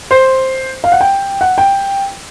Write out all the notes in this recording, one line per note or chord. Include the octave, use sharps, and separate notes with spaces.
C5
F5
F#5
G5
F#5
G5